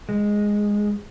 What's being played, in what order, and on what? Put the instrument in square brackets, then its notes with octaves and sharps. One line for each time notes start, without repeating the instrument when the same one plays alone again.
[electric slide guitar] G#3